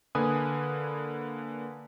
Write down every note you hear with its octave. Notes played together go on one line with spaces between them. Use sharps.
D3 A#3 B4 G#5 D#6